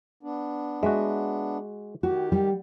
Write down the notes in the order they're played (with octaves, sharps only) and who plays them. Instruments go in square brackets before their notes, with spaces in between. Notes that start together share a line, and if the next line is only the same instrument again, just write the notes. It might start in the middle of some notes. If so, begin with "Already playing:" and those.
[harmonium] B3 D4
[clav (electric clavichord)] G#3 F#4 [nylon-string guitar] E5
[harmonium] D#3 G4 [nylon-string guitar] F#4
[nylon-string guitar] G3